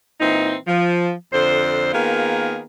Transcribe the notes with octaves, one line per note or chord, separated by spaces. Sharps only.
A#2 E3 C4 D#4
F3
F2 D3 C5
D#3 A#3 B3 F4 G#4